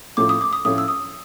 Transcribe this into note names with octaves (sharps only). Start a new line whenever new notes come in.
A2 F3 A3 C#4 F4 D6
D#6
D6
D#6
A2 F3 A3 C#4 F4 D#6
E6
D#6